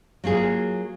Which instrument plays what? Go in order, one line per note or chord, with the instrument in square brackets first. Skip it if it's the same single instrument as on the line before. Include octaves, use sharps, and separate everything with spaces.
[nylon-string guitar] F#3 A#3 F4 G#4